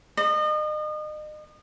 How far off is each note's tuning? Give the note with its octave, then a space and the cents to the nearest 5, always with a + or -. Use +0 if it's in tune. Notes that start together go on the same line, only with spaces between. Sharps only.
D#5 -35